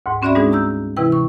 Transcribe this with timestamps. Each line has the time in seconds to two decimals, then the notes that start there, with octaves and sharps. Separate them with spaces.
0.06 D2 G#2
0.22 C4 C#4 F#4 D5 E5 B5
0.35 G3 G#3 D4 D#4 G#4
0.52 A#5 E6 G6
0.97 C3 E3 E4 B4 G5
1.12 C#6